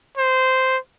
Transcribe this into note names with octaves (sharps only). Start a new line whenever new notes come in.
C5